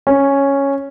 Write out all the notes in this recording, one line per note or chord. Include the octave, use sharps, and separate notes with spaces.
C#4